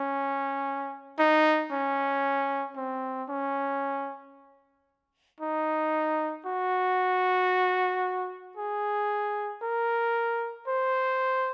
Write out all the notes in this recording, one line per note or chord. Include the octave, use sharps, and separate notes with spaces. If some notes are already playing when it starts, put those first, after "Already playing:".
Already playing: C#4
D#4
C#4
C4
C#4
D#4
F#4
G#4
A#4
C5